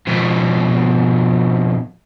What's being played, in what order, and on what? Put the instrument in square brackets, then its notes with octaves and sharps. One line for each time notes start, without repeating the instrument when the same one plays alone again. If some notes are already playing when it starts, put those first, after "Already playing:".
[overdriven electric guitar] F2 B2